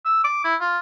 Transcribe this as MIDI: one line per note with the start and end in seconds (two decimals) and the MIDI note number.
0.05 0.22 88
0.24 0.42 86
0.44 0.55 64
0.61 0.79 65